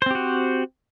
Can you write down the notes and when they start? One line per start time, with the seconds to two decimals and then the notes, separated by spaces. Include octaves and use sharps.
0.02 C5
0.06 C4
0.11 G4
0.15 F#4